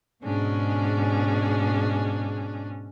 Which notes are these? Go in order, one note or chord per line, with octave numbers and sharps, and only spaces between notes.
G#2 B2 C#4 D4 G#4